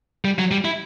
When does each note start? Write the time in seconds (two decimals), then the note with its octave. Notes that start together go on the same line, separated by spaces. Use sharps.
0.25 G3
0.39 F#3
0.51 G3
0.65 E4